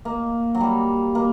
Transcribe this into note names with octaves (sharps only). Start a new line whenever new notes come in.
A#3
F#3
G3
A#3